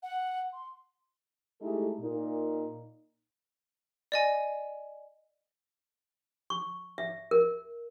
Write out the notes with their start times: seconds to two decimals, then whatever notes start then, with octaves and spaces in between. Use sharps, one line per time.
0.03 F#5
0.53 C6
1.61 G#3 A3 D#4 E4 G4 A4
2.00 A#2 D#4
4.12 D5 D#5 G#5
6.50 C#6
6.98 E5
7.31 A#4